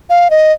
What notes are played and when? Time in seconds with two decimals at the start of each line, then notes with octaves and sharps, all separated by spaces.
0.10 F5
0.30 D#5